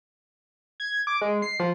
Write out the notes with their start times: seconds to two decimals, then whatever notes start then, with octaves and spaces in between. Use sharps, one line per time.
0.80 G#6
1.07 D6
1.21 G#3
1.42 C7
1.60 F3